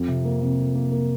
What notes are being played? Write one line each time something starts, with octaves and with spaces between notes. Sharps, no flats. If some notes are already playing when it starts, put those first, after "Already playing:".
Already playing: F2
C3
A#3
C3
F2
A#3
A#3